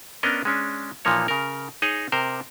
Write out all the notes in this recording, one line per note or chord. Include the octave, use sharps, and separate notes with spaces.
B3 C#4 D4 A#4 D#5
G#3 C#4 D4
A#2 E3 F3 A#3 D#4 C#5
C#3 A#4
D#4 G#4 C#5 D#5
C3 A#4 C5